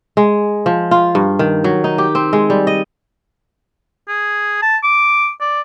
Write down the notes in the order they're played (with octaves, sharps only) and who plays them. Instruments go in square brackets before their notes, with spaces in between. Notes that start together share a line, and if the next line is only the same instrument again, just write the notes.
[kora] G#3
F3
F4
G2
D#3
F#3
D#4
G4
C4
G#3
G3
D#5
[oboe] G#4
A5
D6
D5